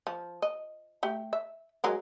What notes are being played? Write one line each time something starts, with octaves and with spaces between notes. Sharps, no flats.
F3
D#5
A3 G4
E5
F#3 G#3 A#4